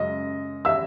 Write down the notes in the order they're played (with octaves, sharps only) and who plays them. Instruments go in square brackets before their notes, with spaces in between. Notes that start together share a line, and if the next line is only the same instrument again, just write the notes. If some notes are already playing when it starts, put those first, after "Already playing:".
Already playing: [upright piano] F#2 C#3 G#3 D#5
E5 E6